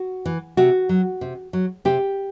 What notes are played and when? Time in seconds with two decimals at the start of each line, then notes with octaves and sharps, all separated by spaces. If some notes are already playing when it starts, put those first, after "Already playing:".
Already playing: F#4
0.26 E3
0.57 C3 F#4
0.89 F#3
1.21 C3
1.53 F#3
1.85 C3 G4